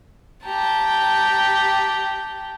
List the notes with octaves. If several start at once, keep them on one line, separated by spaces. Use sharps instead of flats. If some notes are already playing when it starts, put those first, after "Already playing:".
G4 G5 A5 A#5